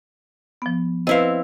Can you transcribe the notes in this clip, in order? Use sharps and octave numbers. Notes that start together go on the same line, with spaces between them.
F3 B3
C4 E4 B4 D#5 F5